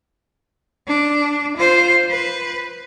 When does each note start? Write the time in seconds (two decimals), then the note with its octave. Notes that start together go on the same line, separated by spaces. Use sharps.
0.87 D4
1.57 F4 C5
2.10 B4